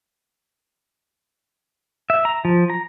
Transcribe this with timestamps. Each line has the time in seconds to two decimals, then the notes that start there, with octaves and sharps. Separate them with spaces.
2.10 E5
2.25 A#5
2.45 F3
2.70 A#5